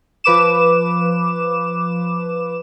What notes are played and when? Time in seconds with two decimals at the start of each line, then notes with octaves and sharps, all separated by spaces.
0.24 F3 B4 D6 E7